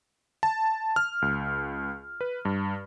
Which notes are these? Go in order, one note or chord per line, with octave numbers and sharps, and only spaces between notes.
A5
F6
C#2
B4
G2